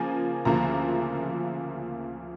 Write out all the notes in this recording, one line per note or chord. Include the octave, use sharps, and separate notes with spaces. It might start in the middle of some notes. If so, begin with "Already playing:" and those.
Already playing: C#3 F3 A#3 G#5
D2 C#3 F3 A#3 A#5